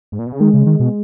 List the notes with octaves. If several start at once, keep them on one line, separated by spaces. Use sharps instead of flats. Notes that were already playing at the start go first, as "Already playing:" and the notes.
G#2
A#2
B2
C#3
D#3 G#3
C#3
D#3
B2